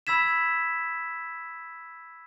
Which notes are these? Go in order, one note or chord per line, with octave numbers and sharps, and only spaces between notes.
B5 E6 G#6 B6 E7